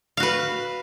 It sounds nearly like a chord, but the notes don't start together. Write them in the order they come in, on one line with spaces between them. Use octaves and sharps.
F5 F#4 B4